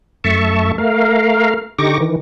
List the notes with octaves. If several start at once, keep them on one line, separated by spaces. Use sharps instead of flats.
F#2 A3 E5 A5 C#6
A3 A#4 F5
D3 D#4 G4 C#6 D6 A#6
D#3 E3